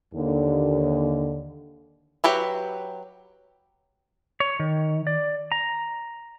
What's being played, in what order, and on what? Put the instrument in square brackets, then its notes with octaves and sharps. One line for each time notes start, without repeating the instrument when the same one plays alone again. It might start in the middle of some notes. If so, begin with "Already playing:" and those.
[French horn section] D#2 D3
[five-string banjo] F#3 G4 B4 E5
[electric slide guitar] C#5
D#3
D5
A#5